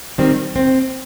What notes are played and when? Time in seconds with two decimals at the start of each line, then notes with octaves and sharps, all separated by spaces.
0.18 D#3 G3 C4
0.56 D#2 C4